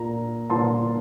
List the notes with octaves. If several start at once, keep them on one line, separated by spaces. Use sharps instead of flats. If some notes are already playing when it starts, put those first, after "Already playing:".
Already playing: A#2 A#5
A#2 A5 C6